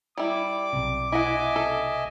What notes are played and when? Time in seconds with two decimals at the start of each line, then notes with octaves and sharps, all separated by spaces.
0.17 G3 E4 D6
0.73 B1 C3
1.12 E4 D#5 E5 F#5 G#5
1.56 A4